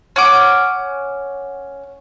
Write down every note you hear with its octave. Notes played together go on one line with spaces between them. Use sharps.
C#4 F#5 D6